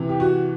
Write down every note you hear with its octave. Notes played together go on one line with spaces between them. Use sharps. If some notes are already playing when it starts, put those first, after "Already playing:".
Already playing: C3 E3
G4
F#4